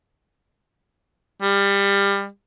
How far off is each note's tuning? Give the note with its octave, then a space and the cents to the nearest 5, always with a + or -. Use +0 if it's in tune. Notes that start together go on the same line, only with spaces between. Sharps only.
G3 +25